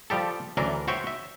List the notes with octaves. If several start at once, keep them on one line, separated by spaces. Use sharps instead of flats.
F3 G3 G4 A4
D2 E3 F#3 C#4 D4 A#4
F#4 C5 C#5 E5 G5
E5